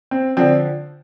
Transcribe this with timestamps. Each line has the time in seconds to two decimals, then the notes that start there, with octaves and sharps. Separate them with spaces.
0.11 C4
0.37 D3 F3 C4